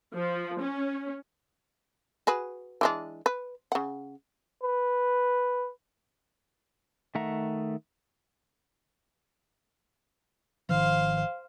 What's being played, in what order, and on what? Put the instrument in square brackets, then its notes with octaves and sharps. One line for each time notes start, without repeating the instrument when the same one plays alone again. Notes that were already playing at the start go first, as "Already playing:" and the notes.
[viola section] F3
C#4
[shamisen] F#4 G#4 B4
E3 G#3 D4
B4
C#3 F#5
[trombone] B4
[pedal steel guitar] D#3 A3 E5 F#5 A#5
[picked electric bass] G#1 D#3 F3 [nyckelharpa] C5 F5